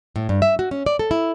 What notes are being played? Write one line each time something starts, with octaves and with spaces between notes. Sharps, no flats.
A2
G2
E5
F#4
C#4
D5
A4
E4